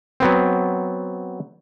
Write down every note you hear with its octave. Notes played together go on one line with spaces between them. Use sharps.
F#3 B3 C4